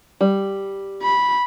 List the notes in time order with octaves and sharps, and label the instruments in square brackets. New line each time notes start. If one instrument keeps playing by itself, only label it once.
[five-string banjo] G3
[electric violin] B5